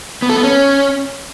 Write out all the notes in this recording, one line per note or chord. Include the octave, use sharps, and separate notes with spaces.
B3
A4
B3
C#4